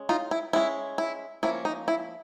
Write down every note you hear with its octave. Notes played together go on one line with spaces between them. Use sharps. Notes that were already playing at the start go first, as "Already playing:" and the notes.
Already playing: G#3 C#4
D#4 F4
E4
G#3 C#4 E4
E4
F3 A#3 C#4 E4
D#4
E4